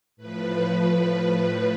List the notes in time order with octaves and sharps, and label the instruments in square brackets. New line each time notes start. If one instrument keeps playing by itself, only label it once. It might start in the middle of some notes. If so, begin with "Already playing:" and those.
[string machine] A2 F3 B4